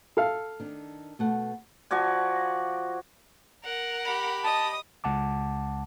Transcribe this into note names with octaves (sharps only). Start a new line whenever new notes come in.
A4 F5
D#3 D4
B2 A3 F#5
F3 F#4 D5 G#5
A#4 F#5
G4 B5
D#5 A5 D#6
C#2 F#5 A5 D6